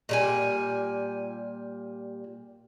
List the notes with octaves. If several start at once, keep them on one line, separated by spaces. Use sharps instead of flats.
A#2 G3 G#5